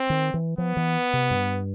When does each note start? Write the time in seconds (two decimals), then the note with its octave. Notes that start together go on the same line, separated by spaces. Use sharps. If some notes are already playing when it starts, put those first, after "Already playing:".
Already playing: C4
0.10 D#3
0.34 E3
0.58 F3 B3
0.77 E3
1.13 C3
1.31 G2